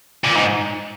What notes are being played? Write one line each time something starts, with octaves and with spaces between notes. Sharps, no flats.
A#2
G#2